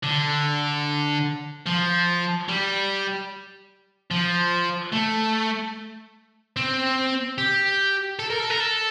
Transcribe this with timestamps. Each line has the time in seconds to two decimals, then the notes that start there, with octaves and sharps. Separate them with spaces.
0.04 D3
1.66 F3
2.49 G3
4.11 F3
4.92 A3
6.57 C4
7.38 G4
8.19 A4
8.30 A#4
8.39 A4
8.50 A#4
8.60 A4